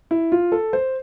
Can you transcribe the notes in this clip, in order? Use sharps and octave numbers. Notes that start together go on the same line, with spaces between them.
E4
F4
A4
C5